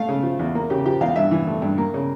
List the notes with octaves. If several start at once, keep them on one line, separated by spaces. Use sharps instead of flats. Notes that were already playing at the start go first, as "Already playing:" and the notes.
Already playing: A3 F5
C#3
F3
E2
A#3
C#3 G4
F3 G4
E2 F5
G2 E5
E3
A3
G2
A#3
C#3